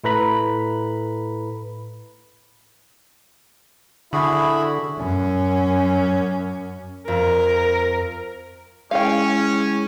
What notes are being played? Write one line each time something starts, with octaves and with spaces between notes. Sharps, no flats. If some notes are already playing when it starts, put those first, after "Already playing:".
A2 E4 A4 B4 A#5 B5
D3 E4 F#4 G#4 B5
F#2 C#4
F2 A#4 F6
G#3 C#4 E4 G#4 F5 G5